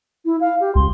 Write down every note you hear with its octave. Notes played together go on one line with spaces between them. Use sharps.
E4
F5
G4
C#2 C6